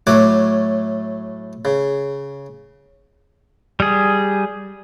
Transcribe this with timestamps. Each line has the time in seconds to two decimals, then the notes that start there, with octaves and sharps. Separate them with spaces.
0.07 A2 F#3 A3 C#5 F#5 D6
1.65 C#3
3.80 G3 G#4